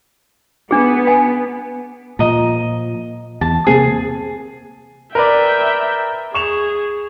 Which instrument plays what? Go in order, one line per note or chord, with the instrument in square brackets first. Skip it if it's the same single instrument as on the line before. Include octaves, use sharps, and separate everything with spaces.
[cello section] B3 [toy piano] D4 G#4
[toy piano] G#5
[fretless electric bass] A#2 F3 [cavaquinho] D#5 A#5
[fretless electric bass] E2 [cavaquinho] A5
[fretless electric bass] C3 A#3 C4 [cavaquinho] G#4
[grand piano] A#4 B4 D5 [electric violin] E5 G5
[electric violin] G#4 [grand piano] C#6 E7 F7